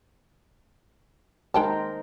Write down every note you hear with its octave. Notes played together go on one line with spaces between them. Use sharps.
G#3 D#4 A#4 C5 G5 A5